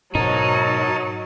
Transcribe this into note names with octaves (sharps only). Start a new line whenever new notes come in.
G#2 B2 F#3 D#4 A#4 C#5 A5